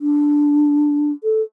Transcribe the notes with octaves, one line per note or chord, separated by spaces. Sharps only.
D4
A4